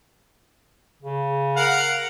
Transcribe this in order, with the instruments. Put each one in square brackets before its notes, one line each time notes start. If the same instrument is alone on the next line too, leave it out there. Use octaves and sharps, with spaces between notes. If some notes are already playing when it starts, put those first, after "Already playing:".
[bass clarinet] C#3
[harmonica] A#4 F5 F#5